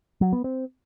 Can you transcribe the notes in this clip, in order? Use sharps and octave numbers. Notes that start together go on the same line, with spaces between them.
F#3
B3
C4